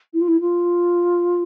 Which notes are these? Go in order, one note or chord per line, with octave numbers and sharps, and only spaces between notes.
E4
F4
E4
F4